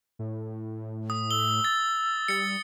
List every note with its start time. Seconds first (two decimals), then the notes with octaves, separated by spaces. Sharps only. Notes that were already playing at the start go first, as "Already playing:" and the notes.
0.19 A2
1.10 D#6
1.31 E6 G7
1.64 A6
2.28 G3 A6 C#7